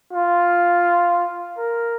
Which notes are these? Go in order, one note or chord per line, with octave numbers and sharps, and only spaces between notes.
F4
A#4